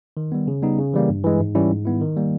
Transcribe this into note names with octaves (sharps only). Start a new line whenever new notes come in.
D#3
G3 B3
C#3
G3 B3 D#4
C#3
E3 G3 A#3
G2
E3 G#3
G#2
E3 G3 C#4 E4
G#2
D#3 G3 B3 E4
D#3
G3 A#3